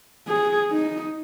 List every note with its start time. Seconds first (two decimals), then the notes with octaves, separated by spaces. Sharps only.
0.28 G#4
0.71 D#4